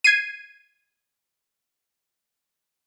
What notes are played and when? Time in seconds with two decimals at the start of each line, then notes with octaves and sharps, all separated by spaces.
0.04 G#6 C7 D#7